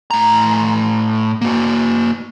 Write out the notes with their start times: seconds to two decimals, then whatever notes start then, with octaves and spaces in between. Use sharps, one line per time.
0.11 A2 A#5
1.41 A#3 F#4